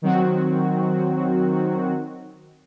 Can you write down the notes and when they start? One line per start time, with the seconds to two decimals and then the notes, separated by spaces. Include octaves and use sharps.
0.02 D#3 F#3 C4 F#4